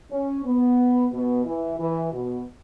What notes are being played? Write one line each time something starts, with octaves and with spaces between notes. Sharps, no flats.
C#4
B3
B2
E3
E3
B2